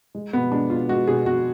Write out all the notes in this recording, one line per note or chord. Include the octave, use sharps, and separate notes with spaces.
G#3
B2 B3
G#3 D4
B2 F4
G#3 F#4
B2 G#4
B2 F#4